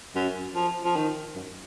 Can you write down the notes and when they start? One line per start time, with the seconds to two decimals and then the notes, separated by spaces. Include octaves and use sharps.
0.15 F#2
0.55 F3
0.85 F3
0.96 D#3
1.36 F#2